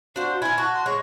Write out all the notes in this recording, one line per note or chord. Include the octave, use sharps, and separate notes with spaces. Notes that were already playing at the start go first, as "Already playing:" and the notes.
D4 F#4 C5 F5
C6
E4 F4 G#5 G#6
F#4 A5 C#6 F#6
C6
G#3 G#4 C#5 C#6